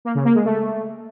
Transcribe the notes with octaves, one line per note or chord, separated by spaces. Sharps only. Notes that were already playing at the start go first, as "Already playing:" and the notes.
A#3
C#3
A#3
G#3
A3